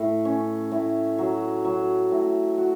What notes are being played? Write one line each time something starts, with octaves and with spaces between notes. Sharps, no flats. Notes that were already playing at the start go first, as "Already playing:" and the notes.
Already playing: A2
C#4
A2
F#3
F#3
A2
F#4